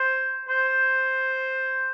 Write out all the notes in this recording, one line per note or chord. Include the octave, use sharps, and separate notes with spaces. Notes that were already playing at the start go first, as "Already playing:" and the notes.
Already playing: C5
C5